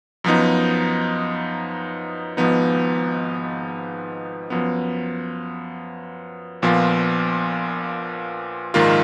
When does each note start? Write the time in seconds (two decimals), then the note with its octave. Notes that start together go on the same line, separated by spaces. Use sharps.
0.24 F#2 F3 B3 D#4
2.37 G#1 G#2 F3 B3 D#4
4.50 F#2 F3 B3
6.62 A#1 A#2 F3 B3 F4
8.74 A#1 G#2 D#3 A#3 F4